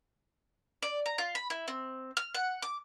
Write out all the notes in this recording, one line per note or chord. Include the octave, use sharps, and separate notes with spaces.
D5
A#5
F4
B5
E4
C4
F6
F#5
D6